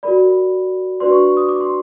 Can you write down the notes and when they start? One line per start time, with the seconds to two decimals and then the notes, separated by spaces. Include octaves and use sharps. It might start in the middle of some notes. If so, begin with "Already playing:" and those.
0.03 F#4 A#4 D5 B5
1.00 D4 F#4 B4 D5 C6
1.12 C#6
1.37 D#6
1.49 D6
1.60 C6